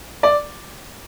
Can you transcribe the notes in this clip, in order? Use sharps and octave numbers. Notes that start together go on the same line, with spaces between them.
D5